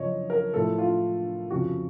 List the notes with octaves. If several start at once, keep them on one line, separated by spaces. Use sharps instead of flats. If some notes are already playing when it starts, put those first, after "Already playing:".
Already playing: F#2 C#3 F3 C#5 D#5
A#4
A2 F3 A4
F4
F2 C#3 F3 F#4